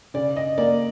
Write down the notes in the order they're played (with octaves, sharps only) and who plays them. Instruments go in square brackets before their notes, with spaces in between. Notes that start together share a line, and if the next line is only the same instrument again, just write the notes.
[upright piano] C#3 D5
D#5
A#3 D5